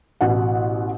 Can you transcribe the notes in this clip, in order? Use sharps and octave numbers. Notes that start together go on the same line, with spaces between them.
A1 B2 F#5